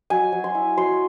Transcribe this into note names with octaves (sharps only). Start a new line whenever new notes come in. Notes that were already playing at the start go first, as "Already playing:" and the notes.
F#3 G#5
F#3
C6
E4
F#3 C6